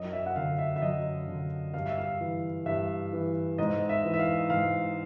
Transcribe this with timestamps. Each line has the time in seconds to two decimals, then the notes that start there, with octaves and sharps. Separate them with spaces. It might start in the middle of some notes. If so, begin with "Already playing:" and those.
Already playing: F#2 D#5
0.13 E5
0.26 F#5
0.36 D3 F5
0.59 E5
0.76 E5
0.82 F#2 D#5
1.28 D3
1.74 G2 F5
1.86 E5
1.98 F5
2.20 E3
2.66 G2 E5
3.13 E3
3.58 G#2 D#5
3.89 E5
4.05 E3
4.14 E5
4.19 F5
4.50 G#2 F5